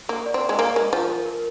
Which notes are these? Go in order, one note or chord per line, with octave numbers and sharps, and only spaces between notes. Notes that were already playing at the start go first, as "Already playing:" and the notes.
A#3 A#4
D5
C4
D5
G#3
A#3 G#5
G#3 A#4
F3 G#5
A#4
A#4